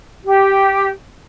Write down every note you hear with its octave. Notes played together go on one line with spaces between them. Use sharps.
G4